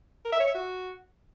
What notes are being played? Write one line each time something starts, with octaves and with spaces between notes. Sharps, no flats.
A#4
E5
C#5
E5
F#4